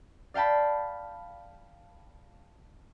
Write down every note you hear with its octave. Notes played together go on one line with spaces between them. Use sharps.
D5 F5 G5 A5 B5